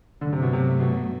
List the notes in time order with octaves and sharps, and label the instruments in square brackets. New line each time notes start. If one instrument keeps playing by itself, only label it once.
[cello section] G2 F#3 A3 [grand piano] D3
[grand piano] C3
B2
C3
B2